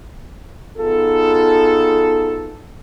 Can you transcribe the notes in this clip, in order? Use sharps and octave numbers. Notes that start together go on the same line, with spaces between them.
B3 D#4 F4 G#4 A4